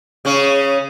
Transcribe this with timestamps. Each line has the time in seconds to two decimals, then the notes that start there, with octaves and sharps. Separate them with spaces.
0.25 C#3 C#4